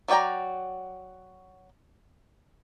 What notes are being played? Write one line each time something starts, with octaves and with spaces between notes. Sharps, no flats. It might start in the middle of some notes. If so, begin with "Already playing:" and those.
F#3 F#4 D5 G5 A#5